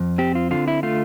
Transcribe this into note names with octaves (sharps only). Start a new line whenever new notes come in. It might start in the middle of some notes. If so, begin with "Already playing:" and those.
Already playing: F2
C4 G4
F4
D3 F4
E4
A3 F4